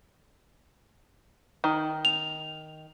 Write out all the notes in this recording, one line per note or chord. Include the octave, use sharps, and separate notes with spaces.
D#3
F7